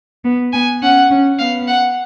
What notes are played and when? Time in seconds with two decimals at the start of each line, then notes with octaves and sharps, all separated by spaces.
0.25 B3
0.53 B3 G#5
0.82 C#4 F#5
1.10 C#4
1.39 B3 F5
1.68 F#5